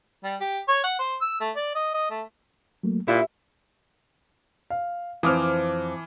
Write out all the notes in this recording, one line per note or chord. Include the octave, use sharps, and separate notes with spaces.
G3
G4
C#5
F#5
C5
E6
A3
D5
D#5
D#5
A3
F#3 A3 A#3
A#2 E4 G4
F5
F2 E3 C5 D6 D#6 F6